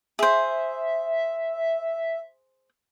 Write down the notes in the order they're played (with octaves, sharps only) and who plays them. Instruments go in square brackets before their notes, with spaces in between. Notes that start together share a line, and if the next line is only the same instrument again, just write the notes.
[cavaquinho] G#4 C5 [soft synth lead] E5